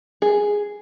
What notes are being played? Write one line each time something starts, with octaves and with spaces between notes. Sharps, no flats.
G#4